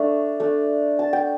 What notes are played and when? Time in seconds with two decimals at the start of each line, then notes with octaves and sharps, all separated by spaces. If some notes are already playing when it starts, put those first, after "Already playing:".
Already playing: A3 D4 D5
0.40 A3 D4
0.99 A5
1.13 G5